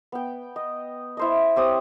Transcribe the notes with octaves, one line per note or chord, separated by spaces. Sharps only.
B3 G5
D#5
E4 C5 D#5
C4 G4 C#5 D#6